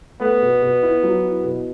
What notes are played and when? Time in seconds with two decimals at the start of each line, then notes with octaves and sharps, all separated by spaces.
0.20 A3 B3
0.41 B2
0.62 B2
0.83 E4
1.03 F#3
1.24 E4
1.44 B2